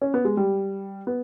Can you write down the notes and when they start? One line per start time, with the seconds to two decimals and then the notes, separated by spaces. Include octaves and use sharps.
0.02 C#4
0.14 B3
0.25 G#3
0.37 G3
1.07 B3